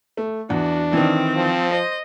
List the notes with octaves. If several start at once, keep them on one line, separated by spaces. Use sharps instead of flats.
A3
E2 D4 F#4
D#3 E3 C4
F3
C5 D#5